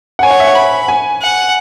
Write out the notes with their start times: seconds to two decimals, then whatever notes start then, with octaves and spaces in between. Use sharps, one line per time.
0.19 F#5
0.23 C#5 G#5
0.31 F#5
0.40 E5
0.47 F#5
0.55 B5
0.88 G#5
1.21 F#5